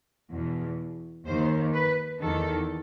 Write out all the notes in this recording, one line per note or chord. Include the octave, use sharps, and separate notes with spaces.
E2 B2
D#2 D#3 C5
B4
E2 D#3 A4